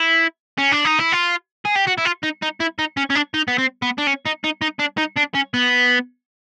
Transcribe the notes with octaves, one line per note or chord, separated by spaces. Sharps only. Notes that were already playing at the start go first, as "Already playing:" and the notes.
Already playing: E4
C#4
D4
D#4
E4
F4
G#4
G4
F#4
E4
F4
D#4
D#4
E4
D#4
C#4
C#4
D4
D#4
B3
C4
B3
D4
C#4
D#4
D#4
D#4
D4
D#4
D4
C#4
B3